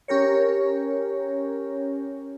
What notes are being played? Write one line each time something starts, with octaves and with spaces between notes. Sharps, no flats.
C#4 G4 A#4 C#5